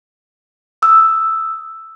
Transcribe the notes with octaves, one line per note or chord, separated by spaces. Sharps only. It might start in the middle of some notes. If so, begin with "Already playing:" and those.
D#6 E6